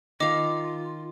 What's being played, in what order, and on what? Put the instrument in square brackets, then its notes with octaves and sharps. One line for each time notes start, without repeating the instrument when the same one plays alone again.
[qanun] D#3 F5 [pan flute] F4 [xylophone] D#5 D6